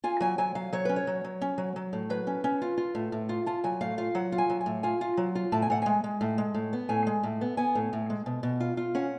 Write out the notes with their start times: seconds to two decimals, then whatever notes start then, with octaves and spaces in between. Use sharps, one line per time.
0.04 F4 G#5
0.21 F#3 G#5
0.38 F#3 G#5
0.55 F#3 F5
0.73 F#3 C#5
0.85 C#4 B4
0.96 C#5
1.07 F#3
1.24 F#3
1.42 C#4
1.58 F#3
1.76 F#3
1.93 A2
2.10 F#3 B4
2.27 C#4
2.44 C#4
2.62 F4
2.78 F4
2.95 A2
3.12 A2
3.29 F4
3.46 F4 A5
3.64 F#3 G#5
3.81 A2 F5
3.98 F4 F5
4.15 F#3 F#5
4.32 F4
4.38 G#5
4.50 F#3
4.61 G#5
4.66 A2
4.83 F4 G#5
5.01 F4
5.17 F#3
5.35 F4
5.52 A2 A5
5.62 G#5
5.70 A2 F#5
5.82 G#3 G#5
6.04 G#3
6.21 A2
6.38 G#3
6.54 A2
6.73 B3
6.89 A2 G#5
7.07 G#3
7.23 A2
7.41 B3
7.57 B3 G#5
7.75 A2
7.93 A2
8.10 G#3
8.26 B2
8.43 B2
8.60 F4
8.77 F4
8.95 C#4 F#5